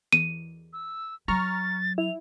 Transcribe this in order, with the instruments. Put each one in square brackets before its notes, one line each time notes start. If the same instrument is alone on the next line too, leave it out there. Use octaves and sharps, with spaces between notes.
[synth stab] E2 [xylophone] D#7
[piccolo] E6
[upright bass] F#3 [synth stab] A#5 C#6 F6 [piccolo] A6
[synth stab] E4 [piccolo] F7